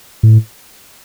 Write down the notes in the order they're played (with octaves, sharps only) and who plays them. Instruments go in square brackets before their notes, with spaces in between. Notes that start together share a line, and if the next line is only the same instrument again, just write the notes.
[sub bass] A2